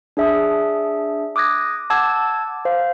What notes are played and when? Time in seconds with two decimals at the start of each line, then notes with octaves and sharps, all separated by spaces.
0.17 D4 G#4 E5 A5 D#6
1.36 D6 D#6 F#6 G#6 A#6
1.90 F#5 A5 D6 E6 G#6
2.65 C5 F5